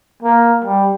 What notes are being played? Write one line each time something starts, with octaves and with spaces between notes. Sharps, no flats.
A#3
G3